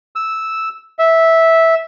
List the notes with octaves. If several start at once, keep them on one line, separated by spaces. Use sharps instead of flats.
E6
E5